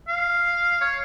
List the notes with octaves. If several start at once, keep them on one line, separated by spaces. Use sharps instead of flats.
F5
C#5